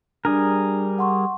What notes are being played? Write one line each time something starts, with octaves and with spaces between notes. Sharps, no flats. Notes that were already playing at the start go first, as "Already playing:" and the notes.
G3 D4 G#4 A#4
F#5 C6 C#6